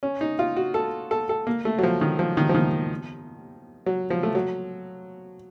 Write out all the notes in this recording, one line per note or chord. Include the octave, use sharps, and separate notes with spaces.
C#4
D#4
F4
F#4
A4
A4
A4
A#3
A3
F#3
F3
D#3
F3
D#3
F3
D#3
F#3
F3
A3
F#3